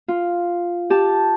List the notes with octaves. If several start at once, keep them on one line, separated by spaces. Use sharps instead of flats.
F4
G4 A5